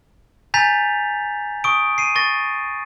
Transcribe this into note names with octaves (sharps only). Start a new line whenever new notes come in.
G#5 A#5 G6 A6 B6 F7
C#6 D#6 D7
C7 D#7
C#6 A6 A#6